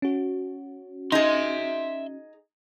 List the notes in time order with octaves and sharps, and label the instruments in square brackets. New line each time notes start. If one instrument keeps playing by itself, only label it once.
[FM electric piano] C#4 F#4
[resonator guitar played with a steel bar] D#4 G#4 [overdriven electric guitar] E5 C6